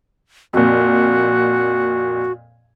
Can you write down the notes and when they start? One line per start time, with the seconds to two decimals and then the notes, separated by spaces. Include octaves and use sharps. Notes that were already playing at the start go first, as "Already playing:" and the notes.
0.53 F2 A#2 F#4